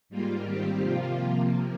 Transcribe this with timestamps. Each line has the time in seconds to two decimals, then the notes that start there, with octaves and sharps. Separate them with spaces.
0.09 G#2 G3 A#3 F4
0.45 D#3 G3 C4 G4
0.82 C3 F3 A#3 F4
1.17 C3 F3 A#3